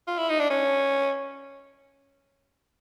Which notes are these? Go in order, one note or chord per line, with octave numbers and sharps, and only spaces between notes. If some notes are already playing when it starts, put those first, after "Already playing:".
F4
E4
D#4
D4
C#4